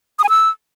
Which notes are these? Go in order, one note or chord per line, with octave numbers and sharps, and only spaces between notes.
D#6
G#5
E6